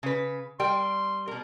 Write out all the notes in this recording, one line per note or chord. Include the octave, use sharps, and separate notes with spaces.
C#3 B4
G3 A#4 G5 C6
B2 A#4